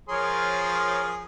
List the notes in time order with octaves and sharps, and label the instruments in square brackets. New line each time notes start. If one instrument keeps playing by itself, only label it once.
[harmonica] F3 G#4 C6 [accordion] A#4 C#5